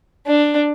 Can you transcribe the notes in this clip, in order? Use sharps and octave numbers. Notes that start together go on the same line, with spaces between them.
D4